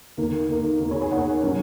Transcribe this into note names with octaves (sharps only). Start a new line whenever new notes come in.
D#2 D#3 A#3
D#2 D#3 A#3
D#2 D#3 A#3 A#4
G#4 C#5
G#4 C#5
D#2 D#3 A#3 C#5 F#5
F#3 C#4